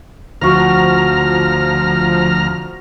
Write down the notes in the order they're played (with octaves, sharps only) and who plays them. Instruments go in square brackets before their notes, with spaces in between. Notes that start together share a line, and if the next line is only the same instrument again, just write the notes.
[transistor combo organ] D2 A#5 F6 [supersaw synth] F3 [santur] F#4 F5